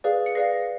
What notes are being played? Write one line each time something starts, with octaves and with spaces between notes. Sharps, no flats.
G#4 B4 D5 F5
C#7
G#4 B4 D5 F5 A#6 C7